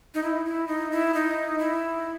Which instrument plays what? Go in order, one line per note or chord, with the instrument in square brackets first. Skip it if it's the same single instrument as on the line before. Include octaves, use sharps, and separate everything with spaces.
[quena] D#4
E4
E4
D#4
E4
D#4
E4